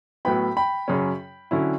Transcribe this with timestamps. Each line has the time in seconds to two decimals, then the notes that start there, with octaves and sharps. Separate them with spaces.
0.25 A2 F#3 B3 E4 G5 B5
0.57 G5 B5
0.88 F#2 C#3 F#3 C#4
1.51 D3 F#3 C#4 E4